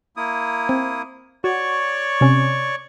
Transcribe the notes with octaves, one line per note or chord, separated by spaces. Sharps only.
A#3 E4 D#6
C4
F#4 C#5 D5 C#6
C3 C#4